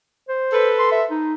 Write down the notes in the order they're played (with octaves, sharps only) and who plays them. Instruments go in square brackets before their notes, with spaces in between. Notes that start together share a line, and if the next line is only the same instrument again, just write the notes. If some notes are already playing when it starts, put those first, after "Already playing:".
[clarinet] C5
[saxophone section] A4 B4
[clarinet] C6
E5
D#4